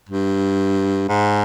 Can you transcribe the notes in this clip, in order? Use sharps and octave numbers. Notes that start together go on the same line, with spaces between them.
G2
G#2